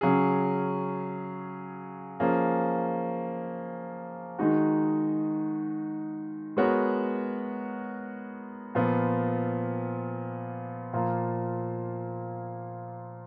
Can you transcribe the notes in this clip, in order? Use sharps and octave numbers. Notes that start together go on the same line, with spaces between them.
C#3 F#3 C#4 G#4
F3 A#3 C#4 G#4
D#3 G#3 D#4 F#4
G#3 B3 F#4 A#4 C#5
A#2 F3 B3
A#2 F3 A#3 F4